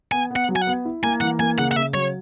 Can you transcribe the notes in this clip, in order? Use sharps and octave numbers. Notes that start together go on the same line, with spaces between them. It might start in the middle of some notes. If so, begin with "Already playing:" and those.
B3 G#5
B3
F#5
F#3
G#5
F#5
B3
E4
A#3 G#5
E3 F#5
A#3 G#5
C#3 F#5
F#5
C#3 E5
F#3 C#5